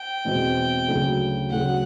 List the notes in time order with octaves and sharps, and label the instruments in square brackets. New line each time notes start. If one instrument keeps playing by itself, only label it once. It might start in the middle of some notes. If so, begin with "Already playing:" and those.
Already playing: [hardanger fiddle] G5
[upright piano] E2 B2 G#3 C4
D2 C#3 F#3 A3
[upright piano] D2 C#3 F#3 A3 [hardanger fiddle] F#5